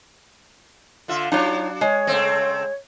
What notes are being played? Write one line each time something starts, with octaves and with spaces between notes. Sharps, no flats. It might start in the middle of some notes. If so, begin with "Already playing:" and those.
D3 F4 E5
F#3 D4 D#4 F4 C#5
G#3 C#5
C#3 A3 C4